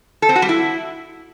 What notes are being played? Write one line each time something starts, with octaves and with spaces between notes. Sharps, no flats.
A4
C4
F#4
G3
E4